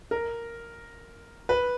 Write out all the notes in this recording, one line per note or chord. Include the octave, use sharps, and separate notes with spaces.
A#4
B4